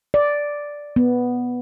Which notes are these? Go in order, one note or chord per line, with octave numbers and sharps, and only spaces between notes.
D5
B3